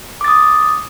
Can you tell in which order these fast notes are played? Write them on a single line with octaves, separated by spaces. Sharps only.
D6 A6 D#6